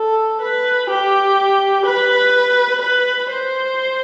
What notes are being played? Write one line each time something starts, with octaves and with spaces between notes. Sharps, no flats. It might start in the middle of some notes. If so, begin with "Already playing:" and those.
Already playing: A4
B4
G4
B4
B4
C5